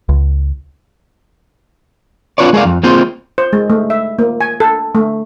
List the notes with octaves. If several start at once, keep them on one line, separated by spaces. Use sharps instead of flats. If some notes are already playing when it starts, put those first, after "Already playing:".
C#2
C4 D4 F4 B4 C#5 D5
G#3 G#4 A#4 C5 D5 F5
F2
A#3 C4 F4 G#4 C5
C5
G#3
A3
E5
A#3
G#5
A4
A3